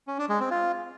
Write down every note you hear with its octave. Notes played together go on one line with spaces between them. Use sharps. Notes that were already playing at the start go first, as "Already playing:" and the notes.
C#4
D4
G#3
C4
F4